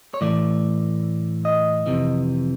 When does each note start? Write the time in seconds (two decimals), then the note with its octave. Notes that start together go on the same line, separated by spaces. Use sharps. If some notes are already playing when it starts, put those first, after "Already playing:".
0.14 C#5
0.21 A2 E3 A3 D5
1.45 D#5
1.86 F2 C3 E3